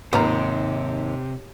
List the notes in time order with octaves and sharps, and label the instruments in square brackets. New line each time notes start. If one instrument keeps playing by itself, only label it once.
[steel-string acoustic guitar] D#2 [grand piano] G#2 [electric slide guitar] C3 [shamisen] B3 F4 A#4